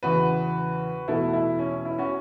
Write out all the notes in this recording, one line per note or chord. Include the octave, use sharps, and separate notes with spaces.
E2 C#3 E3 F#4 B4
E2 B2 A3 E4 A4
E4
C#4
E4
C#4 F#4